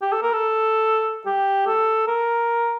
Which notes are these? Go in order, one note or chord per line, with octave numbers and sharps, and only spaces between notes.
G4
A4
A#4
A4
G4
A4
A#4